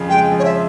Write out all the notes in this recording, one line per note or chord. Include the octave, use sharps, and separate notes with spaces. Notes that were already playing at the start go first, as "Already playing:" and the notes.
Already playing: F2 C#3 F3
G#3 G5
F3
C#5
E5